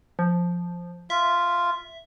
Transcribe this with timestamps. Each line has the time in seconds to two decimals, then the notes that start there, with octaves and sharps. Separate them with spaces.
0.19 F3
1.10 F4 E5